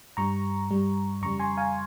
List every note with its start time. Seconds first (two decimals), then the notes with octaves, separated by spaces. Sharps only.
0.17 G2 G3 A#5 C#6
0.70 G2 G3
1.22 F2 C#3 G3 A#5 C#6
1.40 G#5 C6
1.57 F5 G#5